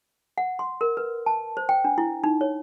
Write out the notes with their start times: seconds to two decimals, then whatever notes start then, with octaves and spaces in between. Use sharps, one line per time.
0.38 F#5
0.59 C6
0.81 A#4
0.97 B4
1.26 A5
1.57 C5
1.69 G5
1.84 D4
1.98 E4
2.24 D#4
2.41 C#5